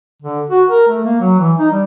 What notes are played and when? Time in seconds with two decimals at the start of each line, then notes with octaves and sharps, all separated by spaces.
0.23 D3
0.50 F#4
0.69 A#4
0.88 A3
1.04 A#3
1.20 F#3
1.39 E3
1.58 D#4
1.71 G3